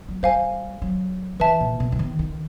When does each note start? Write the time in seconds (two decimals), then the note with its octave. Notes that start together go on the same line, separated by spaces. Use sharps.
0.08 F#3
0.23 G3 C5 F5 G#5
0.82 F#3
1.40 E3 B4 E5 A5
1.60 A#2
1.80 B2
1.92 E3
1.99 D#3
2.19 D#3